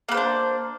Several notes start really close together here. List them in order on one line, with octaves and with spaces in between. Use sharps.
A#3 B4 C5 D4